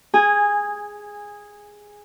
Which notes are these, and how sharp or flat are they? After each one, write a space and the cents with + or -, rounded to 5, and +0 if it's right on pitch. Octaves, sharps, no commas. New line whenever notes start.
G#4 +0 G#5 -15